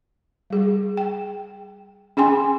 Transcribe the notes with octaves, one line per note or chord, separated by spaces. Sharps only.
G3 G#4
G5
C#4 G#4 G5 G#5 C6